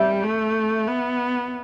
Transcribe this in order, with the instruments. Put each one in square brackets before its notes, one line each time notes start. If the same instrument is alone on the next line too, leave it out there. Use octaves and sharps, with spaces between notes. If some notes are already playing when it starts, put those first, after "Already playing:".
Already playing: [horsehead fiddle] G3 [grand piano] E5
[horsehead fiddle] A3
B3